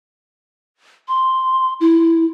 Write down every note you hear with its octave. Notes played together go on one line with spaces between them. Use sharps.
C6
E4